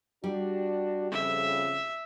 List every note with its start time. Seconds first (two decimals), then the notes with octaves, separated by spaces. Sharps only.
0.24 G3 D4 F#4 G4
1.12 F2 C#3 E5